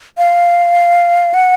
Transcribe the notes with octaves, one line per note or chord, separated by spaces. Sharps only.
F5
F#5